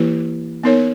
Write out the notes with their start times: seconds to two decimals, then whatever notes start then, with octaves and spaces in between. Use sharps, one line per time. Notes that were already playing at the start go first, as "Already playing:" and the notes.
Already playing: E3 A#3 E4 G4 B4
0.64 B3 D#4 A#4 C#5